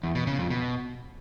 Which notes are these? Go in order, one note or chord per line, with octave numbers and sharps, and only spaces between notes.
E2
B2
C#3
F2
B2